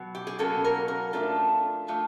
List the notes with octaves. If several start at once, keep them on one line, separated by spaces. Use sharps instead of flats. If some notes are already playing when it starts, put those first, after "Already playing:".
Already playing: B2 F#3
G4
G#4
B2 F#3 A#3 C#4 A4
A#4
A#4
F3 A3 D4 F4 A4
F3 A3 D4 F4